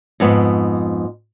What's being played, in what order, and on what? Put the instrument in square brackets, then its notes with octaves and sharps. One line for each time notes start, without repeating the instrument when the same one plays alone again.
[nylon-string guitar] F2 G#2 B3